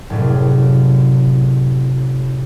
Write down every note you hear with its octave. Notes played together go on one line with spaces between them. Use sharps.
F#1 A2 C3